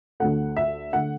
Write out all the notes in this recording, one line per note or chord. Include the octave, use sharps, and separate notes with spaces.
D2 D3 A3 F#5
E5
D3 A3 F#5